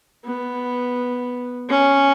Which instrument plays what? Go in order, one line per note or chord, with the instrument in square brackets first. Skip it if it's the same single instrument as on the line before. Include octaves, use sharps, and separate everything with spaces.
[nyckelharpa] B3
C#4